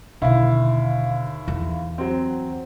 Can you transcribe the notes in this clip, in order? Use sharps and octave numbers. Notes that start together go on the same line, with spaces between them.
D#2 B2 D3 E4 F5
E2
F#3 C4